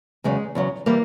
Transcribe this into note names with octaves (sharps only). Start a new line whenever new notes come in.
E2 C#3 F#3 G#3
E2 C#3 F#3
E3 G3 A#3